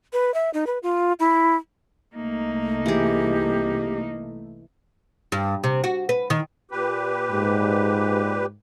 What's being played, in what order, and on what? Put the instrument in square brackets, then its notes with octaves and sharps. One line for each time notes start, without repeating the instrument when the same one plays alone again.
[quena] B4
E5
D#4
B4
F4
E4
[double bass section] C2 A3 [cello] A#3 D#4
[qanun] E3 G#4 [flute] G4
[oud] G2
C3
F#4
B4
D#3
[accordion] A#2 G4 B4
[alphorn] G#2